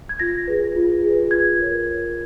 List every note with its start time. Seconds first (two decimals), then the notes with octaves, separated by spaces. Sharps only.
0.09 G#6
0.19 F4 A#6
0.47 G#4 B4
0.76 F4
1.03 G#4
1.08 B4
1.31 F4 G#6
1.59 A#4 C#5